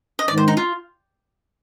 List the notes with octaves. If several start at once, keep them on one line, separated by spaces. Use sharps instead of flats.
D#5
G#2 D#3 G#3 D5
C5
D#4
F4